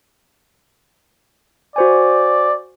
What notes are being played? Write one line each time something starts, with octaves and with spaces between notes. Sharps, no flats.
F#4 C5 D5 G#5